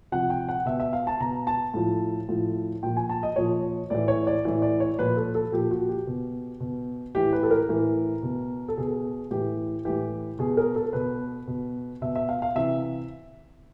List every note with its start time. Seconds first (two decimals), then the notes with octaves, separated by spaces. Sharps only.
0.12 C3 F3 F#5
0.30 G5
0.49 F#5
0.66 B2 E5
0.80 E5
0.93 F5
1.07 A5
1.20 B2 A#5
1.47 A5
1.74 A2 F3
2.29 A2 F3
2.83 A#2 F3 G5
2.97 G#5
3.09 A5
3.23 D#5
3.36 A#2 F3 C#5
3.90 A2 E3 D5
4.08 C#5
4.27 D5
4.45 A2 E3
4.62 D5
4.80 C#5
4.99 A#2 F3 B4
5.17 A4
5.35 A4
5.52 A#2 F3 G4
5.71 F#4
5.89 G4
6.07 B2
6.60 B2
7.15 A2 E3 G4
7.33 B4
7.43 A4
7.51 A#4
7.69 A2 E3
8.23 B2
8.68 A4
8.77 B2 G#4
9.31 A2 E3 G4
9.85 A2 E3 G4
10.39 B2 G#4
10.57 A#4
10.76 A4
10.93 B2 B4
11.47 B2
12.02 B2 E5
12.15 E5
12.29 F5
12.42 F5
12.55 C3 E3 E5